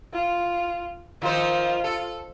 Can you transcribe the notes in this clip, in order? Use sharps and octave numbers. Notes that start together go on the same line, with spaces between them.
F4
D#3 F3 F4 C5
A4